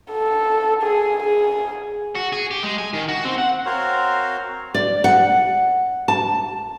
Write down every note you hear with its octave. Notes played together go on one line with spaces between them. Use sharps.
A4
G#4
G#4
F#4
G#4
G4
G#3
G#5
D#3
F#4
C4
F#5
C4 F#4 A#4 C5 C#5 F5
D5
F#5
A5